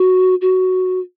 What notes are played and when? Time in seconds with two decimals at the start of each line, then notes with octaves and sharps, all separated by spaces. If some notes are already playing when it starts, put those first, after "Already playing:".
Already playing: F#4
0.41 F#4